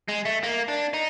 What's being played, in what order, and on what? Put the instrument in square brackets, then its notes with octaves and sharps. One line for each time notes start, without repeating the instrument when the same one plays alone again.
[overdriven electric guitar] G#3
A3
A#3
D4
D#4